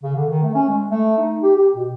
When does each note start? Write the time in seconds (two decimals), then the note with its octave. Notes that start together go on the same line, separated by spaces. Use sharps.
0.03 C#3
0.16 D3
0.29 D#3
0.43 A3
0.55 C#4
0.69 G#3
0.91 A3
1.18 D#4
1.43 G4
1.57 G4
1.76 B2